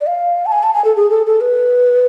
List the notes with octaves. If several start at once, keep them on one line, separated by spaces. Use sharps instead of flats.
D5
F5
A5
G#5
A5
G#5
A4
G#4
A4
A4
B4